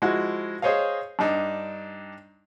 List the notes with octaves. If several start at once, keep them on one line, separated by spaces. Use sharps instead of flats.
F3 G#3 E4 F#4
G#4 C5 C#5 D#5 F5
G2 D4 D#4